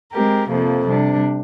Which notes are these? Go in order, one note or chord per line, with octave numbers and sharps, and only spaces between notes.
G#3 C4 G4 A#4
F2 C3 F3 A#3
C3 G3 D4